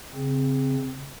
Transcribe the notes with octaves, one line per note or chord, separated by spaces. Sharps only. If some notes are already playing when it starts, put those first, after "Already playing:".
C#3 C4